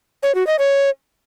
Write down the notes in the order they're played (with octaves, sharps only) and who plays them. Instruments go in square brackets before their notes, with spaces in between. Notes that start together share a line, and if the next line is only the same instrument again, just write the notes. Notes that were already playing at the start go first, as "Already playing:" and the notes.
[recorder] C#5
F#4
D#5
C#5